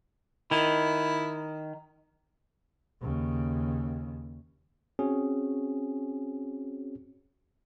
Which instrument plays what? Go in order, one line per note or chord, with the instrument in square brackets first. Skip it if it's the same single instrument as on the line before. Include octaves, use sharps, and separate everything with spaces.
[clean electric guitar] D#3 [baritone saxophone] E4
[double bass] D#2 C#3
[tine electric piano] C4 C#4 F#4 G#4